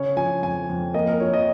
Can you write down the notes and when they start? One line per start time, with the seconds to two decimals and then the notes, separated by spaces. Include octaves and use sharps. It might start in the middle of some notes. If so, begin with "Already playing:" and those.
Already playing: C#3 C#4 C#5
0.17 F3 G#5
0.42 F2 G#5
0.69 F2
0.94 A#3 D#5
1.08 A#4
1.20 F3 C#5
1.34 D#5